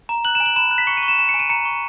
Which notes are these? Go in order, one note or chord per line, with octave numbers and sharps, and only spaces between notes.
A#5
F#6 F#7
E7
G#5
F#7
B5 E7
F#6
B6
C#6 C#7
D#7
C#6
E7
G#5 E7
C#7
G#5
D#7
A#5 C#7
C#6